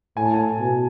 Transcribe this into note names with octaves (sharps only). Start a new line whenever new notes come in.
A2 G#5
A5
G#5
B2